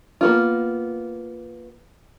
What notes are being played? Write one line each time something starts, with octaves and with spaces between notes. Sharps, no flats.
A#3 B3 F4